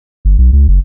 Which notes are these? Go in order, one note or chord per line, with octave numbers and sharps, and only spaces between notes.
G1
B1
C#2
F#1